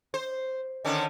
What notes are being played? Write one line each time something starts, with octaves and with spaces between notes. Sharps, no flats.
C5
D3 D#3 C#4